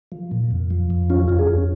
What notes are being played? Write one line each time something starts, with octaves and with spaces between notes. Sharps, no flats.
F3
A#2
F2
F3
F2
C#4 F4
F2 F4
G#4
F2